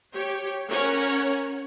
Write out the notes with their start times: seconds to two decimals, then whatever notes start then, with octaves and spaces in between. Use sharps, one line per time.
0.12 G4 C#5
0.70 C#4 A#4 C#5 F#5